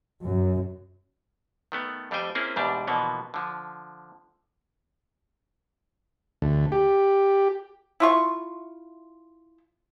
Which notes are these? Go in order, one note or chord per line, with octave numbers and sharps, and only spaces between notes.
F#2
D#3 A3 B3
F2 G3 A3 C5 G5 G#5
A#3 C4 C#4 E4 G#4
E2 G#2 B2 G3 D4
B2 D3 E3 F3 A#3 B3
D3 F3
D2
G4
E4 F4 C#6